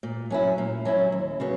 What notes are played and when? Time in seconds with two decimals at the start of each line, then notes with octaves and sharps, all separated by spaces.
0.03 A#2
0.30 F#3 C#4 E4
0.58 A#2
0.85 F#3 C#4 E4
1.12 D#2
1.40 C#3 F#3 B3